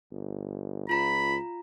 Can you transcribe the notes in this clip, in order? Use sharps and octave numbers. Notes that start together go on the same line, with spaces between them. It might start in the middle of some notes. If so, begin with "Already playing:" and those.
G1
C#2 F4 A#5 B5